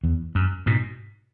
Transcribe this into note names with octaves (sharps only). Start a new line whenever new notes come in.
E2
F#2
G#2 B2